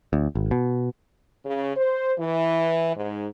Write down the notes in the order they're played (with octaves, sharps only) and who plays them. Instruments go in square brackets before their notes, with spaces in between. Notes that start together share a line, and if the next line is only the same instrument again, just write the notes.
[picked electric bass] D2
G#1
B2
[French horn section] C#3
C5
E3
G#2